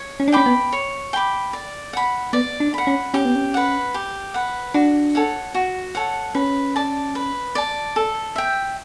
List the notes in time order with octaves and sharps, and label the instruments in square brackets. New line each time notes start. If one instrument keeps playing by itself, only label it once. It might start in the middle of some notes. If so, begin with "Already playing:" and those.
Already playing: [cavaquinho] C#5
[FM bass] C#4
D4
[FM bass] C#4 [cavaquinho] G5 B5 D6
[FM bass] B3
[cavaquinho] C#5
G5 B5 D6
D5
F#5 B5
[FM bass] B3 [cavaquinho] D5
[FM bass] D4
[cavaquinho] F#5 B5
[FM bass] C#4
[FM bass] C#4 [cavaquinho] G4
[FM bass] B3
C#4
[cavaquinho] B4 F#5
G4
B4 F#5
[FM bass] D4 [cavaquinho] F#4
[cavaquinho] A4 C#5 F#5
F#4
A4 C#5 F#5
[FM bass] C#4 [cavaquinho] B4
[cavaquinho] D5 A5
B4
D5 A5
A4
E5 G5